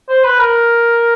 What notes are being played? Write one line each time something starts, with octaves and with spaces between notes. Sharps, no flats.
C5
B4
A#4